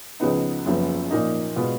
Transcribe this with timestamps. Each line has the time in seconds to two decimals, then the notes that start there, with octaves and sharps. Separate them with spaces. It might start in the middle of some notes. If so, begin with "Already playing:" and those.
0.20 C#2 C#3 F3 B3 D#4
0.65 F#1 F#2 F3 B3
1.11 A#2 F3 A#3 D#4
1.56 B2 G#3 B3 F4